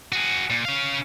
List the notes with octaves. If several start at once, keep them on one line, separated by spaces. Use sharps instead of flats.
F#4 G#4
A#2
C#4 F5